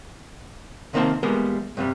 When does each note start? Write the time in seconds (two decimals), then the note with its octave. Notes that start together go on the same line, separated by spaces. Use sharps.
0.93 C3 D#3 A#3 C4 C5 A5
1.23 E3 G3 G#3 A#3 B3 A#4
1.77 G2 C3 G3